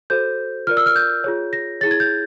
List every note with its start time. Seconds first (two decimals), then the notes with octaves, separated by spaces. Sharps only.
0.10 F#4 A4 C5 G6
0.67 F4 A#4 D5 F6
0.77 E6
0.86 F6
0.96 G6
1.24 F4 G#4 C#5
1.53 A#6
1.81 E4 G#4 C#5 A6
1.91 G#6
2.00 G6